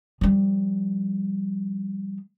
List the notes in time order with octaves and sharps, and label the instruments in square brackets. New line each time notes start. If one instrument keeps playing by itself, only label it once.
[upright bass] F3 G3